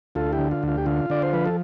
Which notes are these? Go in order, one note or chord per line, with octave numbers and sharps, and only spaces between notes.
D2 F4 A4
E4 G4
D3
F4
D2
F4
G4
D3 F4
D3 D5
C5
F3 B4
A4